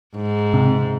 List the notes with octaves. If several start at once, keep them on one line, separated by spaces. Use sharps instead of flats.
G#2
C3